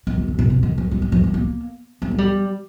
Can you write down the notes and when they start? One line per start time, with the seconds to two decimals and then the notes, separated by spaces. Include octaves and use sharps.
0.07 D#3
0.18 D#3
0.28 D3
0.39 A#2
0.50 C3
0.63 D#3
0.78 F3
0.91 G3
1.02 F3
1.12 F3
1.24 G3
1.34 A#3
2.02 A#3
2.11 G#3
2.18 G3